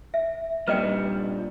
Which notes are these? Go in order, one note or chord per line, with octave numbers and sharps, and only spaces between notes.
E5
G2 A#2 G3 B4 D#5 G5